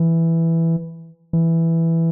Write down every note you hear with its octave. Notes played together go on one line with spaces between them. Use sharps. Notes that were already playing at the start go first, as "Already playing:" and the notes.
Already playing: E3
E3